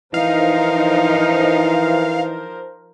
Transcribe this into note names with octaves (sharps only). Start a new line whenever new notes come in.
E3 F3 D#4 A#4 C5 F5